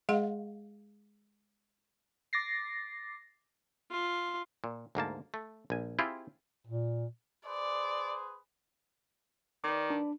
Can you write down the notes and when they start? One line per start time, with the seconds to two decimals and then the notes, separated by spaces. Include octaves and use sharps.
0.09 G#3 G#4 D#5 F5 F#5 C6
2.33 D6 A6 A#6 C7
3.91 F4
4.64 A#2
4.95 D2 G#2 A#3 A5
5.34 A3
5.70 A#1 G#5
5.99 C4 E4 F4 G4 G#4
6.67 A#2
7.47 G#4 B4 C5 D5
9.64 D#3 B4 D5 D6
9.90 D4